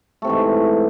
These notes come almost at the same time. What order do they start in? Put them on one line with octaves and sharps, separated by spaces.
A3 C3 E3 G#2